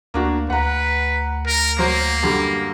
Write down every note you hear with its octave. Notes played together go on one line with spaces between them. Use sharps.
D2 A#3 D4 F#4
D2 B4 F#5 A#5
A#4
F#3 A#3 C5
F#2 D3 G3